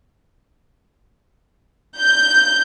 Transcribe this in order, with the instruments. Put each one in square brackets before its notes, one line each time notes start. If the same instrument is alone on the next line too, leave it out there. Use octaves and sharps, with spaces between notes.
[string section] G6